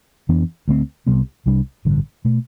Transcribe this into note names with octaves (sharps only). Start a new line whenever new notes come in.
F2 E3 B3 D4
D2 D3 A3 C4
C2 C3 G3 B3
C2 C3 G3 D4
A1 G2 D3
B2 A3